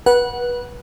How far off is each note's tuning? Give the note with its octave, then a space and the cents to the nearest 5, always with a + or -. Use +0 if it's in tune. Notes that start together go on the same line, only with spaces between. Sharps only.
B4 -25 F#5 +0